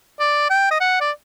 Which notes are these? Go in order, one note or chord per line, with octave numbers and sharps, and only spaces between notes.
D5
G5
D#5
F#5
D5